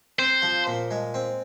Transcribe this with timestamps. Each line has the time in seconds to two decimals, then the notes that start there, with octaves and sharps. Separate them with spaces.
0.18 C4 C5
0.42 F3
0.67 A#2
0.91 G#3
1.14 C4